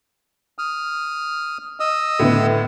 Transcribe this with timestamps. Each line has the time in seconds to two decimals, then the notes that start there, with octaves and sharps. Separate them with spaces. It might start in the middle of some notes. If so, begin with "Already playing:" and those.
0.58 D#6 F6
1.80 D#5 D#6 E6
2.19 A2 D3 B3